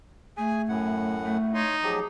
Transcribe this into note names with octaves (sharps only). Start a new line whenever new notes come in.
A3 G#4 G#5
F#2 A2 F#5
A3
D#4 C#5 C6
F3 F#3 G4 G#4